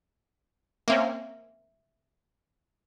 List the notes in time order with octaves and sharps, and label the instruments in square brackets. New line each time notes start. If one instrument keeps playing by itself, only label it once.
[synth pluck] A#3 C4 C#4 [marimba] E5